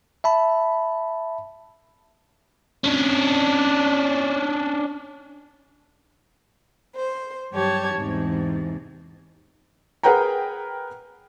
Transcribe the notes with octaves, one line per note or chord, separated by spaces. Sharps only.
E5 A5 B5
C#4 D4
C5
G2 F#3 G4 C#5 A5 G#6
E2 G#2 C3
G#4 A#4 B4 F#5 G5 A#5